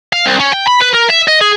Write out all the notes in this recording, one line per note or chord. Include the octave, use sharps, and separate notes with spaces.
F5
C2
C#4
G5
B5
B4
A#4
E5
D#5
G#4